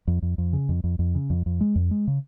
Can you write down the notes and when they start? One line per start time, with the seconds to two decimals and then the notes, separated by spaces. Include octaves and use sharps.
0.07 F2
0.22 F2
0.38 F2
0.53 C#3
0.69 F2
0.84 F2
0.99 F2
1.15 C#3
1.30 F2
1.46 F2
1.61 G#3
1.76 F2
1.91 G#3
2.07 C#3